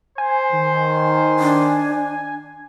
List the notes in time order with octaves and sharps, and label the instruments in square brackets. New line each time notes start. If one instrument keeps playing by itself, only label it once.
[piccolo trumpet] C5 [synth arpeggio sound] G#5
[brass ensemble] D#3
[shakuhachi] D4